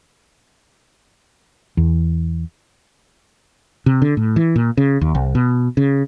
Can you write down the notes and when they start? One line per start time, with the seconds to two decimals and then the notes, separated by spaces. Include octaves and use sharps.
1.77 E2
3.86 C3
4.02 D3
4.17 A2
4.36 E3
4.56 A#2
4.77 C#3
5.01 D#2
5.15 C2
5.35 B2
5.77 C#3